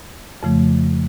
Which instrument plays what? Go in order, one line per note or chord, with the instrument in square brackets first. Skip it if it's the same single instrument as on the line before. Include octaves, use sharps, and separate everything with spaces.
[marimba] F2 C#3 F3 A3